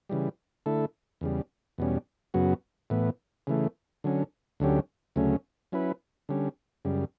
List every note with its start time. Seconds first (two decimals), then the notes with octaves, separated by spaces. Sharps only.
0.09 C#3 E3 G3
0.66 D3 A3 E4 A4
1.21 E2 C#3 G3
1.78 E2 B2 G3 C#4
2.34 F#2 C#3 F#3 B3 F#4
2.90 A2 E3 B3
3.47 C#3 E3 A3
4.04 D3 F#3 C#4
4.60 D2 D3 F#3 C#4 G4
5.16 D2 C#3 F#3 A3 C#4
5.72 F#3 C#4 E4 B4
6.29 D3 G3 C#4
6.85 F#2 C#3 G3